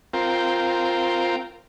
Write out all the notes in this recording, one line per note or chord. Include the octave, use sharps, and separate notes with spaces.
C4 F4 A#4 G5